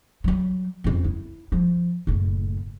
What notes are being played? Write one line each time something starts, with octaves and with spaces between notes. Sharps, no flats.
F#3 G3
F2 C#4
E4
F3
F#1 A2